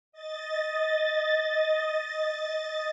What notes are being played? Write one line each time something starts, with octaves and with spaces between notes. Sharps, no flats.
D#5 A6